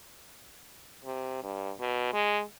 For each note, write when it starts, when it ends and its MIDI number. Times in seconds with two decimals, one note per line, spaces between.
1.05 1.38 48
1.43 1.72 43
1.80 2.12 47
2.13 2.42 56